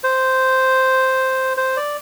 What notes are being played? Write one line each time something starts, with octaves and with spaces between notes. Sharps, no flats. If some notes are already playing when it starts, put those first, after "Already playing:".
C5
C5
D5